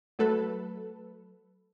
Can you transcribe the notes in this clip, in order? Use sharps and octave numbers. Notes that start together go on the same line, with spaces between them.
F#3 A3 A4 B4